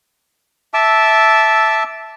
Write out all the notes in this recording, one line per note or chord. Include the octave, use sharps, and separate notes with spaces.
E5 A5 D6 E6